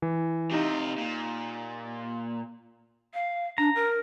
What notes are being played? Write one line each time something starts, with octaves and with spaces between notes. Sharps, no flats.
E3
C3 D#4 F4 G4
A#2
F5
D4 A#5
A#4